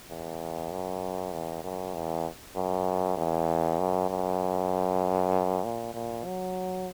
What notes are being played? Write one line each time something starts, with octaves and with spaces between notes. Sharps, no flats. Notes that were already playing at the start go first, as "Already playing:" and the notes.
E2
F#2
E2
F#2
E2
F#2
E2
F#2
F#2
A#2
A#2
F#3